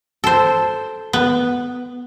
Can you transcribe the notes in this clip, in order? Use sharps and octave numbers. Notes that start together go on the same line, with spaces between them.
A4 C5
B3